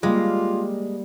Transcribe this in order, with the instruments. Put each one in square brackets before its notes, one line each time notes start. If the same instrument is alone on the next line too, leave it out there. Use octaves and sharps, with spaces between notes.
[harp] G3 A#3 [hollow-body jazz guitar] G#3 [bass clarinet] F4